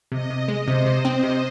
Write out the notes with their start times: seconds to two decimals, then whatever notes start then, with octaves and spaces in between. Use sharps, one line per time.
0.12 C3 D#5
0.30 C3
0.40 D#5
0.48 G#3
0.68 C3 C5
0.86 C3
1.05 C4
1.23 C3